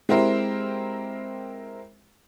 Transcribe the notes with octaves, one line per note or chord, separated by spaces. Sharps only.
G#3 C4 E4 G4 A#4 C5